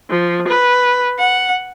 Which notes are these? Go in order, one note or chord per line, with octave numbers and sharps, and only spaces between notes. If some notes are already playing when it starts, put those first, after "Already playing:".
F3
B4
F#5